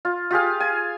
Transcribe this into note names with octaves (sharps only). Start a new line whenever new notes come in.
F4
F4 G4 G#4 F5
G#5